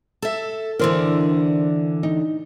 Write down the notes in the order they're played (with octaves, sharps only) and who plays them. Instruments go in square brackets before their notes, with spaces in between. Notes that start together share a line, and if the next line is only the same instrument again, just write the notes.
[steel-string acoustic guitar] A4 E5
[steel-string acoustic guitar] D3 E3 D4 [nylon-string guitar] A#4 C5
[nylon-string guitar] D#4